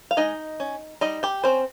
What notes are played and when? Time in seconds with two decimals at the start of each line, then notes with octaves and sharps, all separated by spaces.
0.11 F5
0.17 G#3 D#4 D#5
0.60 C#4
1.01 G3 D#4 D#5
1.23 G4 G5
1.44 C4 C#4 C5